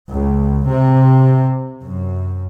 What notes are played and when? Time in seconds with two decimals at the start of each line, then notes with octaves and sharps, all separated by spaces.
0.11 C#2
0.67 C3
1.82 F#2